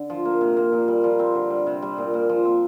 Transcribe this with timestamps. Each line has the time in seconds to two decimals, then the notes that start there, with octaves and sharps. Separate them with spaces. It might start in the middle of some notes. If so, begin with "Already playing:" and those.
Already playing: D3
0.10 F3
0.25 A#3
0.41 C3
0.57 A#3
0.72 A#2
0.88 G3
1.04 F3
1.19 C4
1.35 D3
1.50 G3
1.67 C3
1.82 G3
1.98 A#2
2.14 A#3
2.29 F3
2.45 C4